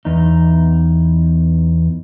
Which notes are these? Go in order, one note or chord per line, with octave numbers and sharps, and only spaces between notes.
E2 D#4